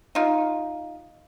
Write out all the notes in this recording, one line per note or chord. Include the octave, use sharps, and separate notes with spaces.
D#4 F4